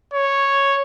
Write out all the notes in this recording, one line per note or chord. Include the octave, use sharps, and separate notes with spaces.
C#5